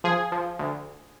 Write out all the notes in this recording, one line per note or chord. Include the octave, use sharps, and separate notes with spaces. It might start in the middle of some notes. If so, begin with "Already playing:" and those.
F3 G#4
F3
D2